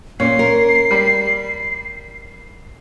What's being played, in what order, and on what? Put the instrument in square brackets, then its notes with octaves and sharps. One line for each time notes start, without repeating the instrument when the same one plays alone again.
[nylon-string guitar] A#2 [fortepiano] C#4 [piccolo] C7
[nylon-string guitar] A#4
[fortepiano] G3